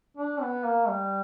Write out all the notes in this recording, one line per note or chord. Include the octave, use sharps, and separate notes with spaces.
D4
B3
A#3
G3